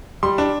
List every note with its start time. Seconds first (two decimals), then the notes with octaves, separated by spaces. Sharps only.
0.23 G3 C6
0.38 D4